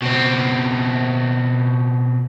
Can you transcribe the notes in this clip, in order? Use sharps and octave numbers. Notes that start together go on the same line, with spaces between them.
B2 C4